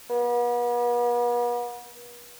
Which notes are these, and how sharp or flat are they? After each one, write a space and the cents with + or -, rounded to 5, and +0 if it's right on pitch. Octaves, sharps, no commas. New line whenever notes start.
B3 -40